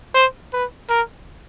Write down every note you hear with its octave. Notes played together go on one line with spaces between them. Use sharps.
C5
B4
A#4